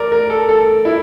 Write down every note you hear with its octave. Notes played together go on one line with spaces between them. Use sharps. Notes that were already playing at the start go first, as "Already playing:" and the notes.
Already playing: A#4 D5
A#4
A4
A4
E4